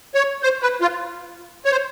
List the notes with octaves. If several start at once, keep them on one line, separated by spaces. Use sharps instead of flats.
C#5
C5
B4
F4
C#5
C5